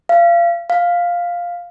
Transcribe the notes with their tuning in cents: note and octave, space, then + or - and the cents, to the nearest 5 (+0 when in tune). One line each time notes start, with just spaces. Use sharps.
F5 -30
F5 +5